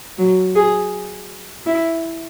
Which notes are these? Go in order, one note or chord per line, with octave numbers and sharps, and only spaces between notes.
F#3
G#4
E4